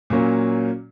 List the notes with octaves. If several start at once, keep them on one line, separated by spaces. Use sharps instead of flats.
A#2 F#3 A#3 C#4